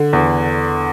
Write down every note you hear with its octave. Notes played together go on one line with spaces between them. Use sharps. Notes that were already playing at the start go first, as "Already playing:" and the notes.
Already playing: D3
E2